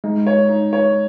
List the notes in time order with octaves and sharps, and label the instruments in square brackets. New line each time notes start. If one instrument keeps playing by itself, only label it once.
[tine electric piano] G#3 [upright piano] D#4
[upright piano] C#5
D#4
C#5